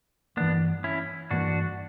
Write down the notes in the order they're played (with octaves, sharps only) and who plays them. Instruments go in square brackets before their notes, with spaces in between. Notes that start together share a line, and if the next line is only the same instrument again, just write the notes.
[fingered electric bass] G2 E3 A#3 [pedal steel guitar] B3 D4
[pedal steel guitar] C#4 E4
[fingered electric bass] G2 E3 A#3 [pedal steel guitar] D4 F#4